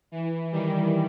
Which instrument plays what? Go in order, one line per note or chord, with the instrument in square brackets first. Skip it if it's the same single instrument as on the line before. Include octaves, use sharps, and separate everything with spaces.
[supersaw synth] E3
D#3 G3